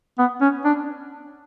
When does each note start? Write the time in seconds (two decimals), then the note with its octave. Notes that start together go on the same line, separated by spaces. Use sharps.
0.18 B3
0.41 C#4
0.65 D4